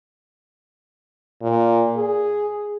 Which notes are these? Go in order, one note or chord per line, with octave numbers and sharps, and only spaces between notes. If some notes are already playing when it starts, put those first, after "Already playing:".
A#2
G#4